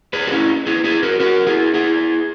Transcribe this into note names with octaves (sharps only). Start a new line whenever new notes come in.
G#4 B4
F#4
C#4 E4
E4 G#4
E4 G#4
F#4 A#4
F#4 A#4
E4 G#4
E4 G#4